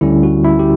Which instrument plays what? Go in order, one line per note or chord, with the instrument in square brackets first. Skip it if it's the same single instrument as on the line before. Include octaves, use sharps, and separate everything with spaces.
[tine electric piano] D2 D3 G3 C#4 E4
F#4
E4
G4